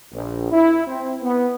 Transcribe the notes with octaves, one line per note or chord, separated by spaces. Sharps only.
A#1
E4
C4
B3